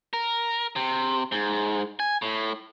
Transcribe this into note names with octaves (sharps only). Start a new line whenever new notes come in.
A#4
C3
G#2
G#5
A2